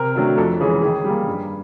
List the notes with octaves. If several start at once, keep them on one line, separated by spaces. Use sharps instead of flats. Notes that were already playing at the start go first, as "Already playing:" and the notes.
Already playing: C3 A#4
D#3 F#3 A3 D4
F2 A4
C#3 E3 G#3 C#4 G#4
D#3 G#4
G3 A#3
G2